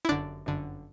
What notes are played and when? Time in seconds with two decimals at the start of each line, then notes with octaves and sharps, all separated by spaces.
0.05 E4
0.09 G1 F#2 D3 D4
0.46 G1 F#2 D3